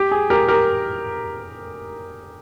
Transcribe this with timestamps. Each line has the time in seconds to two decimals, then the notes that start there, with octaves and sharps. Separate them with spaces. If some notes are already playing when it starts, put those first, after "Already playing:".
Already playing: G4
0.11 G#4
0.30 G4 A#4
0.48 G4 A#4